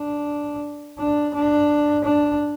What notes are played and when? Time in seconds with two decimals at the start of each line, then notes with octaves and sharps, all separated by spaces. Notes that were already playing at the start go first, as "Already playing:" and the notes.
Already playing: D4
0.99 D4
1.34 D4
2.04 D4